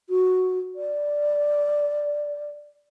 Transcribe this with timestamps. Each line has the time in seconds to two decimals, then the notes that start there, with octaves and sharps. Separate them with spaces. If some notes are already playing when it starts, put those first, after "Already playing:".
0.10 F#4
0.75 D5